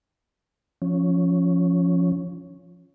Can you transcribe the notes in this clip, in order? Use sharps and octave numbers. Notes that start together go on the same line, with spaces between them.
F3 C#4